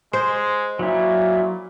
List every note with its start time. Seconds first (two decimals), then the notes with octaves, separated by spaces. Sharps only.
0.13 G#3 C5
0.79 A#2 F#3 E4